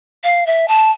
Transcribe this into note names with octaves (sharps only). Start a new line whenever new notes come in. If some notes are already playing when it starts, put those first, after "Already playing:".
F5
E5
A5